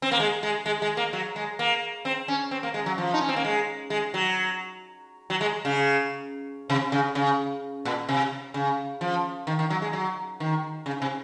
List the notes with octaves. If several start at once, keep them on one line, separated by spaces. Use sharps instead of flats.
C4
A#3
G#3
G#3
G#3
G#3
A#3
F#3
G#3
A#3
C4
C#4
C4
A#3
G#3
F#3
F3
D#4
C#4
C4
A#3
G#3
G#3
F#3
F#3
G#3
C#3
C3
C#3
C#3
A#2
C3
C#3
F3
D#3
D#3
F#3
G#3
F#3
D#3
C#3
C3